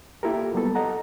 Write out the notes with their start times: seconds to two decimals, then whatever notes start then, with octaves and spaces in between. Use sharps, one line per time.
0.23 A#3 E4 F4 G4 A4 A#4
0.54 F#3 G3 A#3 B3 A4
0.75 A4 D#5 F#5 A#5